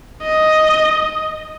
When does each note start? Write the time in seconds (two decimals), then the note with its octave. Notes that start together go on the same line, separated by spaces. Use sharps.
0.23 D#5